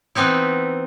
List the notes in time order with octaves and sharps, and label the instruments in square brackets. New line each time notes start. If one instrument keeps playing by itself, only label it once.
[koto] E3 B3 C4 D#4 E4